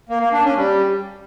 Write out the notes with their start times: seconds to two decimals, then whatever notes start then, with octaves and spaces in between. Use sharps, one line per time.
0.09 A#3
0.21 A#3
0.33 D4
0.44 C#4
0.56 G3